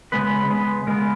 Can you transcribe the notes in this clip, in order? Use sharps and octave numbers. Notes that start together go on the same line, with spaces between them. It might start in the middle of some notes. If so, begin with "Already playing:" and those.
C#3 G#3 B3 B4
C#3 G#3 B3
C#3 G#3 B3 A#4